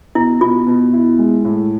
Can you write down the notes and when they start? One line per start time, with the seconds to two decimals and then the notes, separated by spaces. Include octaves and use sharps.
0.15 B2 E4
0.41 B2 F4
0.67 B2
0.93 E4
1.18 G#3
1.45 A2